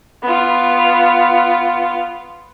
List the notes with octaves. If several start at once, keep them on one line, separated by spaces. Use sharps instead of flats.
B3 F4